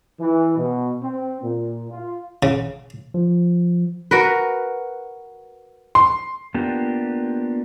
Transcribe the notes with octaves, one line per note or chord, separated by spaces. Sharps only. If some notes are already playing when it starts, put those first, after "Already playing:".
E3
B2
C4
A#2
F4
C#3
F3
F#4 A#4 B4
C6
A#3 B3 D4 F4 G4